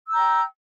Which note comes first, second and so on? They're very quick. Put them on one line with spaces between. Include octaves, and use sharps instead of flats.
E6 G6 A#5 G5